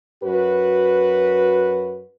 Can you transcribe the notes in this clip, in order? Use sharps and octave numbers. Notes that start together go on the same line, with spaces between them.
F#2 F#4 B4